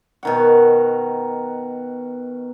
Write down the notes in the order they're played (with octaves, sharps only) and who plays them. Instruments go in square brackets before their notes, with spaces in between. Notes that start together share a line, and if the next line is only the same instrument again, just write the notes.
[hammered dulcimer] B2 D#3 F#5